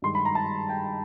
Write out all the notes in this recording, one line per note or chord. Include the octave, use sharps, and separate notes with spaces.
G2 D#3 G#3 C6
B5
A#5
A5
G5